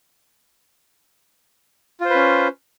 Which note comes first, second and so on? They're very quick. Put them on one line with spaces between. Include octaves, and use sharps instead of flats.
F4 C5 B4 C#4